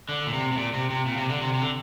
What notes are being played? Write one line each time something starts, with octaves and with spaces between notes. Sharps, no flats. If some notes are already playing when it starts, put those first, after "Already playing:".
D3
A#2
C3
C3
A#2
C3
C3
A#2
C3
D3
C3
C3
D3